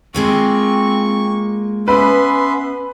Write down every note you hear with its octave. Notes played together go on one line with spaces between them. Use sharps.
G#3 A#3 C4 F4 C#6
B3 C#4 B4 E5 C6